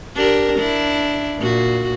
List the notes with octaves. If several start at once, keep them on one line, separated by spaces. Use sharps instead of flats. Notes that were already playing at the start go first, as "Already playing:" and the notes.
D4 G4 A#4
D4 E4
A#2 F#4